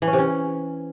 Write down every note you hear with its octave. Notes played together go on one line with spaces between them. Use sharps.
E3
C#4
C3
C#4